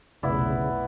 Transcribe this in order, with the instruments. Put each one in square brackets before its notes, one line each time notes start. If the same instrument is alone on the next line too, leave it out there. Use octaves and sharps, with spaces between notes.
[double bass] F1 B1 [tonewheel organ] C#3 [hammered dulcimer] B3 E4 D5